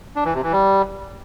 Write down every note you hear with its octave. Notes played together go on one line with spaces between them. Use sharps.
D4
E3
C3
E3
G3